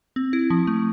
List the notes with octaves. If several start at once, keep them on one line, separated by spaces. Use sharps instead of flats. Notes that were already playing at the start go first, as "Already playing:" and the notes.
C4
E4
F3
A3